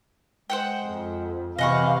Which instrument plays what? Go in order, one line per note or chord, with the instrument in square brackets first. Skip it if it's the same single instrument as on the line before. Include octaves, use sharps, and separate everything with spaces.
[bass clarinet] G#3 [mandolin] C5 F#5 G5
[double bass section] F2
[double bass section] C3 [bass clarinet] E3 [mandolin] D#5 F#5 C#6 [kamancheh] F5